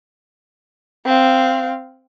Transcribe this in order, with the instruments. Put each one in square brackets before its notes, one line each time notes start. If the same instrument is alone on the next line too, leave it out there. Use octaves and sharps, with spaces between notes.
[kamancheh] C4 F5